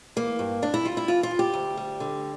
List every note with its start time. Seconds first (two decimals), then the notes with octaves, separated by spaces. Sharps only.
0.16 E3 A#3
0.39 G2
0.62 G2 D4
0.74 E4
0.85 G3 F4
0.97 E4
1.08 E3 F4
1.23 F4
1.31 G2
1.39 G4
1.54 D2
1.77 G3
2.00 D3